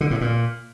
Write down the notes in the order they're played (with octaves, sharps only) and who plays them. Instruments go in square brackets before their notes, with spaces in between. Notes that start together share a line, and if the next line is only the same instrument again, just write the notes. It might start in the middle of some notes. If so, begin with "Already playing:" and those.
[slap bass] D3
A2
A#2